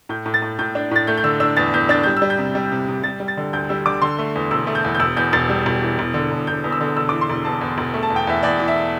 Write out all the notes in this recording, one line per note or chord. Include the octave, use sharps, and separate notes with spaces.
A2 G6
A2
A6
A2
A2 G6
D4
A2 A6
A3 G6
G6
D3 E6
D4 E6
E2 A6
E2 G6
D4 A6
G3 G6
E6
G3
G6
C3
G3
C3
C3
G3 A6
G3
A6
D3
D2 G6
G3 E6
D3 D6
D3 C6
A3
E2
E1 E6
A3
G6
E2
G6
E1 E6
E2 G6
E1 A6
G3
E1
E3
E1
D3
E1
E1 G6
E2
E6
D3
E1 E6
E3 D6
C6
E1
E2 A5
E2
E1
A3
A5
E2
G5
E2 E5
E2 D5
E3
E5